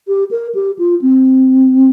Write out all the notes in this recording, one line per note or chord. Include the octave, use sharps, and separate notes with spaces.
G4
A#4
G4
F4
C4